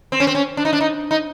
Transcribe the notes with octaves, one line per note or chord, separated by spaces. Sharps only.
C4
C#4
C4
C#4
D4
D#4
D4
D#4
D#4